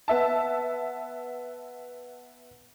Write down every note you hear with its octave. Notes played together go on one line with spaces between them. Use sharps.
B3 E5 A5